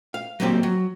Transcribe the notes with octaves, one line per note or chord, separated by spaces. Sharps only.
F5
F#3 G3 A#3 C4 G4
F#3